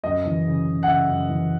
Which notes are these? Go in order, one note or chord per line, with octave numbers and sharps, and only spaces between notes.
F#2 D#5
E3
C#3
C#3
F#5
C#3 E5
F#2
E3